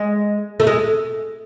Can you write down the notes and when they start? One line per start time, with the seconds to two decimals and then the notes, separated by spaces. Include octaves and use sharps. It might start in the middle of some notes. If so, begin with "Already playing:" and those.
Already playing: G#3
0.60 A3
0.67 G#3